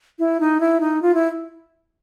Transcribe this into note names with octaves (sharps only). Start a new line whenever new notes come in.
E4
D#4
E4
D#4
F4
E4